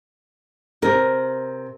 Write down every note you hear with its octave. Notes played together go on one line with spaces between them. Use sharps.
C3 A#4